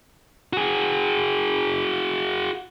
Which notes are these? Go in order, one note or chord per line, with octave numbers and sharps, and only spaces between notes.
F#4 G#4